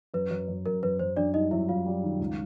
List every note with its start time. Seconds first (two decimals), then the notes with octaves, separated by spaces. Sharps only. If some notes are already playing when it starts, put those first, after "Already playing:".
0.14 F#2 B4
0.31 F#2
0.48 F#2
0.66 F#2 A#4
0.83 F#2 B4
0.99 F#2 C5
1.16 F#2 D4 D5
1.34 G3 D#4 D#5
1.51 F#2 E4 E5
1.69 F#2 F4 F5
1.86 G3
2.03 D#3
2.19 C#2